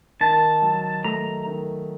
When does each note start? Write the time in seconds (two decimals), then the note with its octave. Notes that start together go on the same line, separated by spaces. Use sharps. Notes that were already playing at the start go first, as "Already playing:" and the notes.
0.20 D#3 A5
0.62 F#3
1.04 A3 A#5
1.46 D#3